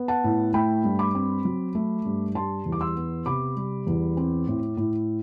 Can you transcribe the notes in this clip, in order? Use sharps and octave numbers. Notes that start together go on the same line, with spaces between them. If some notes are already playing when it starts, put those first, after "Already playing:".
Already playing: B3
F#5 A5
A2
A3 G5 B5
G2
B5 D6
C4
F#3
A3
G2
G3 A5 C6
E2
D6
C6 E6
B3
C3 B5 D6
G3
E2
C4
A2
A2